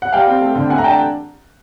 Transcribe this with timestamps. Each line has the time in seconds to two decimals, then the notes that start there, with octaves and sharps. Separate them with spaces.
0.02 F#5
0.13 G3 F5 G5
0.27 C4
0.41 A3
0.55 D3
0.70 A3 F#5 G#5
0.78 A#5
0.84 D4 G5 A5